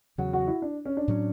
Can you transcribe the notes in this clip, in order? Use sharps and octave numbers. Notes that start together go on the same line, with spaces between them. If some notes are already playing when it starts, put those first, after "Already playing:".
E2 C#3 F#3 F#4
F#4
E4
D4
C#4
D4
A2 F#3 C#4